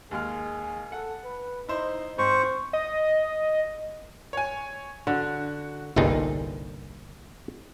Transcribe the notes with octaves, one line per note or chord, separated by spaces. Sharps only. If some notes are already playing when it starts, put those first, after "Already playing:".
D#2 G#3 G#4 F6
A4 F#5
B4
D#4 E4 C5
G#2 C4 C5 C#6
D#5
C#5 G#5
D3 F#4
G1 C2 G2 A#2 D#4 G#4